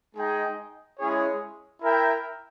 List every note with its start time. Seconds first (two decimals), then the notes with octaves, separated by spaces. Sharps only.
0.15 G#3 D#4 G#4 D#5 G5
0.99 G#3 C#4 E4 G#4 C#5
1.82 E4 A#4 E5 G5